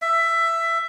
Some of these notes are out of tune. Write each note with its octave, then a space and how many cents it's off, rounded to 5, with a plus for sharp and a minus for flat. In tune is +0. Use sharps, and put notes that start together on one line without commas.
E5 +15